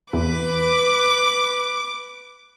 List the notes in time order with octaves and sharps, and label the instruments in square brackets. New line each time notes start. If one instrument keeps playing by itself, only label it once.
[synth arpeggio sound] E2 [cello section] B4 [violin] D6